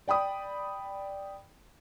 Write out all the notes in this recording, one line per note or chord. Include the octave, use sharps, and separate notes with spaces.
D5 G5 B5 D#6